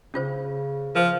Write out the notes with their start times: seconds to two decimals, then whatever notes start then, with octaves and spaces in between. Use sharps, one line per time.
0.14 C#3 C#4 F4 C5
0.95 F3 A#4 C5